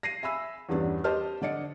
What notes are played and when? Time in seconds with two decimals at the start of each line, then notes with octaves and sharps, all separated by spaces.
0.03 A#6 C7 D#7
0.23 E5 G#5 B5 E6
0.69 E2 G2 B3 C#4 D4
1.04 G4 C5 D#5 A5 F6
1.41 D3 D4 D5 D#5 C#7